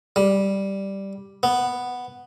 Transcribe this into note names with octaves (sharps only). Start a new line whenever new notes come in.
G3
B3